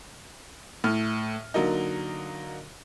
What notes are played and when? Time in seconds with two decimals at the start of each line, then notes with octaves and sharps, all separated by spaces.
0.84 A2 F6
1.54 D3 F#3 A#3 D#4